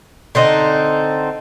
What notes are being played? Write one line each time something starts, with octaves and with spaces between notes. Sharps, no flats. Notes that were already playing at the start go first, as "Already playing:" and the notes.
D3 C4 D#4